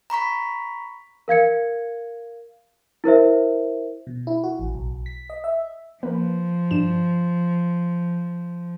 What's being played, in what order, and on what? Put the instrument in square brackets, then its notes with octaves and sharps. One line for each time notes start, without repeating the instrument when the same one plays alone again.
[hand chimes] A#5 B5 C#6 B6
[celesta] A#4 F5 G#6 C#7
E4 A#4 C5 E5
[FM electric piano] B2
E4
F#4
A1
B1
B6
D#5
E5
[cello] F3 [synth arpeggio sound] A#3 B4
[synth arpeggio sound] G2 D4 E7